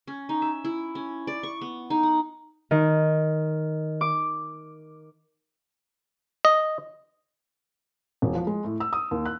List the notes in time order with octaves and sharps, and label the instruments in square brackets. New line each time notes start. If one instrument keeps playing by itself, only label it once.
[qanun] C#4
D#4
E5
E4
C#4
D5
C#6
B3
D#4
F#5
[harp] D#3
D6
[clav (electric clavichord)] D#5
[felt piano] E1
F3
G#3
A2
E6
D#6
D#2
F#6